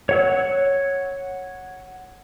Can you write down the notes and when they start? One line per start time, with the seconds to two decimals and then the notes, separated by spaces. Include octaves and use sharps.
0.09 C#5 F#5 E6